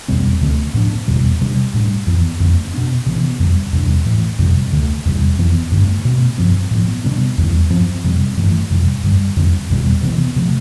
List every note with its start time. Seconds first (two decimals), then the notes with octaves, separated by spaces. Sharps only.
0.08 E2 B2 G3 C4
0.41 D2 D3 A3 C4
0.74 A2 F3 B3 D4
1.08 E2 B2 G3
1.41 C3 G3 D4
1.74 A2 G3 D4
2.06 F2 E3 B3
2.40 F2 D3 A3 C4
2.74 B2 B3 D4
3.06 C3 E3 B3
3.39 F2 D3 G3
3.73 E2 C3 G3 D4
4.06 A2 E3 A3
4.39 F2 C3 G3
4.72 D2 D3 A3
5.05 E2 C3 G3
5.38 F2 E3 B3
5.71 G2 D3 A3
6.05 B2 A3 C4
6.38 G2 F3 C4
6.71 A2 F3 B3
7.04 C3 G3 B3 D4
7.38 E2 D3 G3
7.70 G2 F3 C4
8.04 F2 C3 G3 C4
8.37 G2 E3 A3
8.70 F2 C3 G3
9.03 G2 D3 G3
9.36 F2 D3 G3 C4
9.70 E2 B2 G3
10.03 C3 E3 B3
10.36 C3 F3 A3